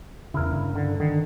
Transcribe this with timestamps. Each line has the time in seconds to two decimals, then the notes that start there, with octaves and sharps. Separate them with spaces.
0.34 E2 C#3 E4 A#4
0.51 G2 C#3
0.75 D3
1.00 D3 D#3